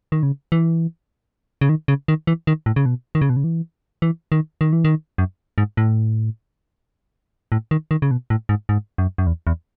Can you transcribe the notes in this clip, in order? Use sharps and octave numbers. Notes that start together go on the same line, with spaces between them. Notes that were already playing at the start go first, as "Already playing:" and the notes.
D#3
C#3
E3
C#3
D#3
C#3
D#3
E3
D#3
A2
C#3
B2
D#3
C#3
B2
C#3
E3
E3
D#3
D#3
E3
D#3
F#2
G#2
A2
A2
D#3
D#3
C#3
B2
A2
G#2
G#2
F#2
F#2
E2
E2